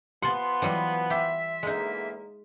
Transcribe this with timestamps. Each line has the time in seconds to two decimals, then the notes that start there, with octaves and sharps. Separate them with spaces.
0.22 F3 B3 F#5 A5 C6
0.62 E3 F#3 G3
1.10 G4 E5
1.63 E2 D3 G#3 A#3 D#4